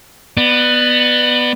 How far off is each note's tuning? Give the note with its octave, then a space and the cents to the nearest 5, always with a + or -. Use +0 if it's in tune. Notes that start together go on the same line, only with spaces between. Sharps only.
B3 +0 D5 +30